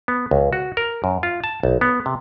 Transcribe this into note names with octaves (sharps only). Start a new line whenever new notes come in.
B3
C#2
F#4
A#4
F#2
F4
A5
B1
B3
C3